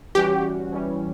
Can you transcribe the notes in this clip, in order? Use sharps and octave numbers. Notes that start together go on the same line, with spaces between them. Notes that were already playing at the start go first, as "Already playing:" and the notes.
E3 G3 C#4 F#4 G4
E3 G3 C#4